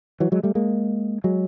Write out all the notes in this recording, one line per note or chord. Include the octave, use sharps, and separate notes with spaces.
E3 F#3
F#3 G#3
G3 A3
G#3 A#3
F#3 G#3